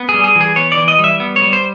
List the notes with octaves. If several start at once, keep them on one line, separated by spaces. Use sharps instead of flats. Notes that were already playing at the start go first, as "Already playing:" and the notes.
Already playing: B3
G#4
G3
G#4
E3
G#4
B3 C#5
D5
E3
D#5
G3
E5
B3
C#5
G3
C5